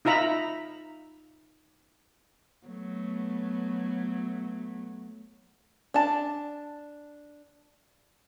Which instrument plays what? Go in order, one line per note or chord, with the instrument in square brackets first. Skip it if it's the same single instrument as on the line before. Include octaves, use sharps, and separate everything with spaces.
[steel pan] D#4 F4 E5 A#5 B5
[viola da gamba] F#3 A3 B3
[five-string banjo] D4 A5